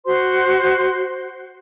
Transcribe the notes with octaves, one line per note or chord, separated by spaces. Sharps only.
F#4 C5 C6